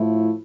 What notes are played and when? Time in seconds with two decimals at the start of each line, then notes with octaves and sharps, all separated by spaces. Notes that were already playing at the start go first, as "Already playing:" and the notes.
Already playing: A2 F3 A3 E4